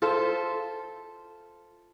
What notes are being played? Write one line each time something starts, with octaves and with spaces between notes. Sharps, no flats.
F4 A4 C5 E5